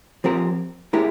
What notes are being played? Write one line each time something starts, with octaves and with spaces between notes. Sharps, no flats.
F3 C4 G4 A#4
G#3 E4 G4 A#4